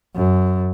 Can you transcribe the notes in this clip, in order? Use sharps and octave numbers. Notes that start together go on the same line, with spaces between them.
F#2